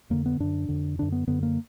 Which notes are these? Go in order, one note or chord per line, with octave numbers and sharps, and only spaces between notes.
F2 D3 A#3
B3
F#2 D3 D4
F2 D3
F#2 D3 D4
B3
F#2 D3 B3
A#3